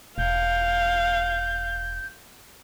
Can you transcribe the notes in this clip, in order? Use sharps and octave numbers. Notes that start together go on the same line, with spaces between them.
E1 F5 G6